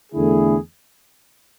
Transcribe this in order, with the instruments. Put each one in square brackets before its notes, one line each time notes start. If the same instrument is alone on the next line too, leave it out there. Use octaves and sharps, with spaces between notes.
[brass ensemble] E2 D3 A3 E4 G#4